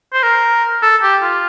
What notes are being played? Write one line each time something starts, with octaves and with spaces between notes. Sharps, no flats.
C5
A#4
A4
G4
F4